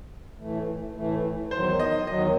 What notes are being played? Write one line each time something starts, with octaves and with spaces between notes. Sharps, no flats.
A2 E3 A3
A2 E3 A3
E2 D#3 F#3 C5
D#5
E2 D#3 F#3 D#5